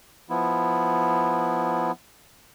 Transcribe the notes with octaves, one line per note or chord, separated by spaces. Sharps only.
F3 B3 E4